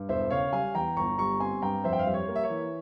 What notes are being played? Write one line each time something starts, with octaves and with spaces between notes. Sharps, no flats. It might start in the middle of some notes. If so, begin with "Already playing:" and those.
Already playing: G2
E1 C5 E5
C#3 C#5 F5
G3 F5 G#5
E2 G5 A#5
G1 A#5 C#6
G3 A#5 C#6
C4 G#5 C6
G2 G5 A#5
F2 C5 E5
G5
F5
G3 E5
C#5
A#3
E5
C#5
E3